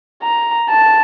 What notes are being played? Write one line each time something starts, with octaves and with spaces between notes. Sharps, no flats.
A#5
A5